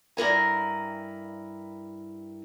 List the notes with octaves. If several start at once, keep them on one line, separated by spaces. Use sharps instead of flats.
G2 E4 A#4 G#5